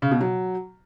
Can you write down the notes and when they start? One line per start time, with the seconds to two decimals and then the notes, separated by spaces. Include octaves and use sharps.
0.02 C#3
0.11 B2
0.21 F#3